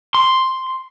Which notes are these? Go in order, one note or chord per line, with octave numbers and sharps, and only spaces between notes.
C6